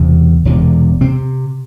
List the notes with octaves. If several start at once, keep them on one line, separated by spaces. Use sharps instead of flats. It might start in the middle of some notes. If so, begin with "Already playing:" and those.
Already playing: E1 E2 C3
E1 E2 C3
C3 C4